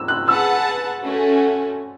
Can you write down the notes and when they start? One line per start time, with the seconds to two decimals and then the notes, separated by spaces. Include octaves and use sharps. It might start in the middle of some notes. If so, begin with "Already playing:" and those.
Already playing: E6
0.08 F#6
0.28 G#4 B4 F#5 A5 E6
1.03 A3 C#4 F#4